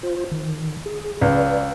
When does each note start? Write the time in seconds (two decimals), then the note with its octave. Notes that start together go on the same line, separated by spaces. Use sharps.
0.03 F4 C5
0.32 D#3
0.86 G#4
1.21 C#2 B4 D5